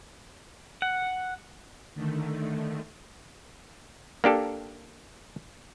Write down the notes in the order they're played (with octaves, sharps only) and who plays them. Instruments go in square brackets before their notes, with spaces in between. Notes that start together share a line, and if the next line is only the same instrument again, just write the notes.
[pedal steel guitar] F#5
[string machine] D3 D#3 A3
[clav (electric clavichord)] A#3 D4 G4 A4